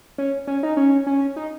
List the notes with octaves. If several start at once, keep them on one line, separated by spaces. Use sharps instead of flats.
C#4
C#4
D#4
C#4
C#4
D#4